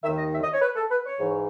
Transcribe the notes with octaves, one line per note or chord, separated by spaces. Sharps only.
D#2 D#3 E5
D#5
E5
D#5
C#5
B4
A4
B4
C#5
G#2 E3